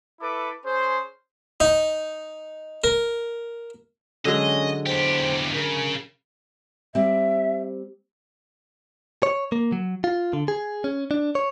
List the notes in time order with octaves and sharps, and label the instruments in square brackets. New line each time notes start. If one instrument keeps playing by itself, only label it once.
[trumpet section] E4 A4 B4 D6
C#4 G#4 C5
[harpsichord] D#4
A#4
[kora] D3 F#3 G#3 [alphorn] C#4 [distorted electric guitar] D#5
[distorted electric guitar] E2 G4 [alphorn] C5
[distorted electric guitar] C#3 [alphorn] A#4
[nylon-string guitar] G3 C4 [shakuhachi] E5
[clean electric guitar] C#5
A#3
F#3
F4
D3
G#4
C#4
D4
C#5